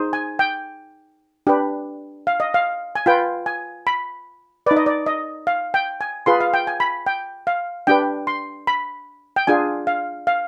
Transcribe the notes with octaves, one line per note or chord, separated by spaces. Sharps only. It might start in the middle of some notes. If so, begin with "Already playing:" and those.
Already playing: D#4 G#4 C5
G#5
G5
D4 G4 B4
F5
D#5
F5
G#5
F4 B4 G5
G#5
B5
D#4 B4 D5
D#5
D5
D#5
F5
G5
G#5
F4 G#4 B4 C6
F5
G5
G#5
B5
G5
F5
D4 G4 B4 G5
C6
B5
G5
D4 F4 G#4 G#5
F5
F5